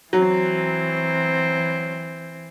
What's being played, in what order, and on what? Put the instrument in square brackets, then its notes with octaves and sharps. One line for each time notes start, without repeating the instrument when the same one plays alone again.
[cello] E3 C4 [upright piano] F#3